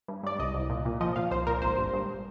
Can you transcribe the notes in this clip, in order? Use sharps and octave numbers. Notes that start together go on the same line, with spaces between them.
G2
G2 D5
C2 D#5
C2
A#2
A#2
F3 D#5
A#2 F5
C2 C5
A#2 A#4
G#1 C5
G2
G2